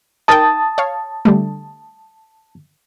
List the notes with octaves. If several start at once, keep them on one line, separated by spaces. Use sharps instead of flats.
D#4 A#4 G5 A5 D#6 A6
C#5 F5
D3 G3 A3